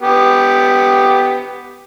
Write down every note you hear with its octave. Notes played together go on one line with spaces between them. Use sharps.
B3 G4